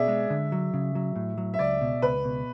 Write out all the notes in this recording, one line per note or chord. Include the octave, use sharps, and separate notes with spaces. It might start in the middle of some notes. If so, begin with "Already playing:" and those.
Already playing: B2 G#4 D5 E5
G#3
D3
F#3
C#3
F#3
A2
F#3
E5
C#2 D5
B2
C#2 B4
B2